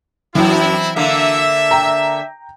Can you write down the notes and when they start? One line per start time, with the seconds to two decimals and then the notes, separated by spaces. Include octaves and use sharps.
0.35 F#2 E3 F#3 C4 E4
0.96 D3 A#3 E5
1.71 G5 A#5